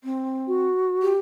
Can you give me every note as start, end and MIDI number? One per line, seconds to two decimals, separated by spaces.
0.04 0.66 60
0.48 1.13 66
1.02 1.18 67